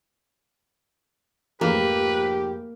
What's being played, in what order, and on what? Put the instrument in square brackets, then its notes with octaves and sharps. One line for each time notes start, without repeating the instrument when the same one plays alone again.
[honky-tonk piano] F1 G#2 F3 [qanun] A#3 [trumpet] G4 [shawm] B4